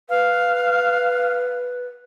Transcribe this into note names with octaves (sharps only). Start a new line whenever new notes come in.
B4 F5